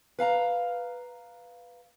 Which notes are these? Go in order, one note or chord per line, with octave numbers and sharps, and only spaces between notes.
B4 F5 A5 A#5